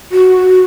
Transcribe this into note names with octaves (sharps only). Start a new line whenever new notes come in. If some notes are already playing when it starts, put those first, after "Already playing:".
F#4